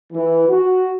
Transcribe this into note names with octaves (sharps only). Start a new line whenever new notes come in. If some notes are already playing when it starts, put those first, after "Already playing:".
E3
F#4